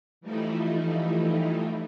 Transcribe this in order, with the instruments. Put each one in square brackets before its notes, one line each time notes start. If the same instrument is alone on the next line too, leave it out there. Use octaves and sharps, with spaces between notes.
[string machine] E3 F3 G3 A3 D#4 E4